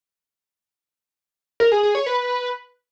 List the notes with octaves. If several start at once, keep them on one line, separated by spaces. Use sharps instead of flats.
A#4
G#4
G#4
C#5
B4